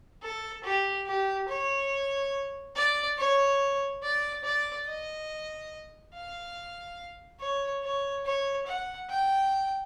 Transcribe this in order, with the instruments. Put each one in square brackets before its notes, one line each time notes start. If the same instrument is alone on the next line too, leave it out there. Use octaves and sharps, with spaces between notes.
[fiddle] A4
G4
G4
C#5
D5
C#5
D5
D5
D#5
F5
C#5
C#5
C#5
F#5
G5